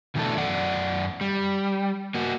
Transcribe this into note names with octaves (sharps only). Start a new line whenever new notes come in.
B2 D3 E3 A3 D4 A4
F#2 D5 F#5
G3
A#3 F#4